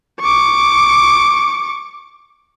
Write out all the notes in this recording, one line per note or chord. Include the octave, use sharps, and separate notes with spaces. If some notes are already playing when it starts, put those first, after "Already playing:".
C#6 D6